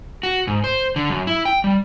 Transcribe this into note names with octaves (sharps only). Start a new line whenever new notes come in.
F#4
G#2
C5
D3
F#2
E4
G5
G3